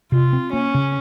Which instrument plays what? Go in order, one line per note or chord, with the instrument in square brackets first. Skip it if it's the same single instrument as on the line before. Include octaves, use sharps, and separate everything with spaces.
[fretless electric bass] C3 [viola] F4
[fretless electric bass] C4
[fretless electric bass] A#3 [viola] C#4
[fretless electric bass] C#3